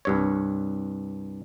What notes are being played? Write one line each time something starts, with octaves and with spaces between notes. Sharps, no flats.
C2 G2 C#5